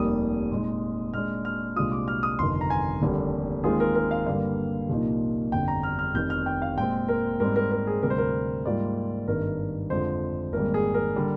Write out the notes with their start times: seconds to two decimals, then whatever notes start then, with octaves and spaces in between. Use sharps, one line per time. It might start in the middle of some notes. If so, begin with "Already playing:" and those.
Already playing: F1 D#2 D#3 G3 A#3 D#6
0.51 A#2 G#3 D#4
1.13 A#2 G#3 D4 F6
1.45 F6
1.76 C2 A#2 G#3 D4 F4 D#6
1.91 D6
2.08 F6
2.23 D#6
2.39 G1 F2 C3 D#3 C6
2.61 A#5
2.70 G#5
3.02 F1 D#2 D3 G3 A#3
3.64 D#2 D#3 G#3 C4 F4 G#4
3.80 A#4
3.95 A#4
4.11 F5
4.27 G2 D3 G3 A#3 F5
4.89 C2 A#2 F3 A#3 D#4
5.52 G1 F2 D3 G5
5.68 A#5
5.83 F6
5.99 F6
6.15 F1 F2 D#3 G6
6.30 F6
6.46 G5
6.62 F5
6.77 A#2 G#3 C4 G5
7.08 A#4
7.40 G#2 G3 C4 A#4
7.56 A#4
7.71 A#4
7.87 G#4
8.02 D2 C3 G3 A#4
8.10 C5
8.18 A#4
8.65 G#2 G3 A#3 F4 D5
9.27 G#1 G2 D#3 A#4
9.90 F2 D3 F3 G#3 C5
10.53 G#1 G#2 G3 A#3 A#4
10.74 G#4
10.94 A#4
11.16 D3 G3 D4